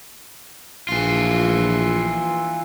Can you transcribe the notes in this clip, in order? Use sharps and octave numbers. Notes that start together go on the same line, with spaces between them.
A#1 E3 F4